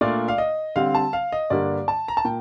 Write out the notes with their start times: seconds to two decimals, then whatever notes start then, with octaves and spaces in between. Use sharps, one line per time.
0.01 A#2 A3 D4 F4 D5
0.28 F5
0.38 D#5
0.76 D3 G3 C4 F5
0.95 A5
1.13 F5
1.32 D#5
1.50 G2 D3 G3 A#3 D4 D5
1.88 A5
2.08 A#5
2.17 A5
2.25 A#2 G5